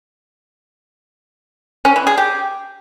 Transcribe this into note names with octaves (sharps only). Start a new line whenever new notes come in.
C#4
E3
G#4
G4